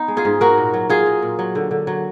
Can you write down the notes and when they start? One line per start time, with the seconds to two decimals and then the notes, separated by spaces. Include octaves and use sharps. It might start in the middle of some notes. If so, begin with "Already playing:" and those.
Already playing: B3 D#4
0.08 G#3
0.17 F4 G#4
0.25 G#2
0.41 A#3 F#4 A#4
0.58 A#2
0.74 F#3
0.89 F#3 F4 G#4
1.06 F#3
1.22 A#2
1.39 F#3
1.55 D3
1.71 D3
1.87 F#3